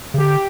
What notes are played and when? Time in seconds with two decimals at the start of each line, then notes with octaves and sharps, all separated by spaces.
0.14 C#3
0.18 D3 G4